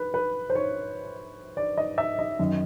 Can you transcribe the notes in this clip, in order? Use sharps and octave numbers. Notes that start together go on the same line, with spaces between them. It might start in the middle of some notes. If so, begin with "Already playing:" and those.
Already playing: B4
B4
C5
C#5
D5
D#5
E5
D#5
F#2 D#3